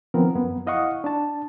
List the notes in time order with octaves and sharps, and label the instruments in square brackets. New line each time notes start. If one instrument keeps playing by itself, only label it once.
[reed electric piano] D#3 F3 B3 C4 A#4
F#2 B3
E4 D#5 F5 F#5 C#6
D4 A5